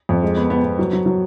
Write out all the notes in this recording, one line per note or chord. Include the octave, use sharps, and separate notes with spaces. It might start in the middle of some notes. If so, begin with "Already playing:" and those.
F2
G#3
B3
B3
B3
F#3
F#3
F#3